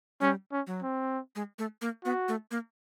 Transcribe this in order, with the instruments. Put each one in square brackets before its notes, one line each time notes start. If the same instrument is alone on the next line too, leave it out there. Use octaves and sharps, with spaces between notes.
[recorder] G3 [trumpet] C#4
[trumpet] C#4
[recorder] F#3
[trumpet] C4
[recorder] G#3
A3
A#3
[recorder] B3 [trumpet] F#4
[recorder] A3
A#3